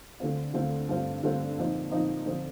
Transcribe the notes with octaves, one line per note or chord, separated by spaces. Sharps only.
D2 D3 A3 C4 F4
D2 D3 A3 C4 F4
G2 D3 A3 C4 F4
G2 D3 A3 C4 F4
A#2 F3 C4 D#4
A#2 F3 C4 D#4
D3 F3 C4